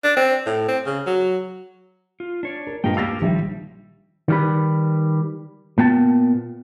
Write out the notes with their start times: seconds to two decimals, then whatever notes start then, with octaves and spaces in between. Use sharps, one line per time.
0.04 D4
0.17 C4
0.46 A2
0.68 C4
0.86 C#3
1.06 F#3
2.20 F4
2.43 D4 C#5 D5
2.67 A#4
2.84 G2 A#2 G#3 A#4 D#5 G5
2.97 A#3 G4 F5 E6 A6 A#6
3.22 A#1 D#3 F3 G3 G4 E5
4.28 D#3 G3 B4
5.78 A#2 B3 G5 A5